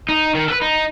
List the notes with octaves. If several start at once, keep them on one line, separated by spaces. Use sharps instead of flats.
D#4
D#3
A4 B4
D#4